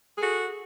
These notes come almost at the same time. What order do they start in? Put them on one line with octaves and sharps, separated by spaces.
G#4 A4 F#4